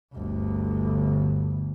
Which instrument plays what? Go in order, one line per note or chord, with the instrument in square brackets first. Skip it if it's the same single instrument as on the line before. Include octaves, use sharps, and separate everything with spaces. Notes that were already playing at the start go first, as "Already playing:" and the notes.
[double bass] G1 D2